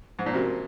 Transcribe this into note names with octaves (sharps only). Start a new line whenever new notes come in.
G#2
A#2
C3 C#4 F#4 A#4